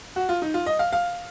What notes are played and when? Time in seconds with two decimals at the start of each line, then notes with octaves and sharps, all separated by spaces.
0.16 F#4
0.29 F4
0.42 D#4
0.54 F4
0.66 D#5
0.79 F5
0.93 F5